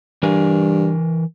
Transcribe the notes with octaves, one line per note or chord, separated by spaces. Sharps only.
G2 E3 A#4 G#5